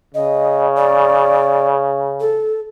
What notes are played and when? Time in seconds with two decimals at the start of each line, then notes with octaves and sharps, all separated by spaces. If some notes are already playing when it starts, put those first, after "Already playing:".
0.14 C#3 D#5
0.77 D5
2.20 A4